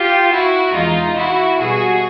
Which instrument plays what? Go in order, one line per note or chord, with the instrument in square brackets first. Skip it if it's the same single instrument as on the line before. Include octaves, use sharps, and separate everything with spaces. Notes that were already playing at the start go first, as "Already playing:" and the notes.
Already playing: [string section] F4 G4
E4 F#4
E2 C3 E3 G#3 D#4 F4
E4 F#4
B2 G3 F#4 G#4